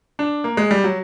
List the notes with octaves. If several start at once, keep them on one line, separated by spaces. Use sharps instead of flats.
D4
A#3
G#3
G3
F#3